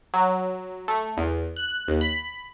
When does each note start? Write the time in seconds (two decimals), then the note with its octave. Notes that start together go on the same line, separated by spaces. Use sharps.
0.14 F#3
0.88 A3
1.17 E2
1.56 F#6
1.88 D#2
2.01 B5